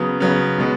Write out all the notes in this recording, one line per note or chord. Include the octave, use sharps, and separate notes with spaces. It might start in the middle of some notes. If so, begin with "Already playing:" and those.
Already playing: C#3 F#3 B3 D#6
C#3 F#3 B3
B2 G#3 B3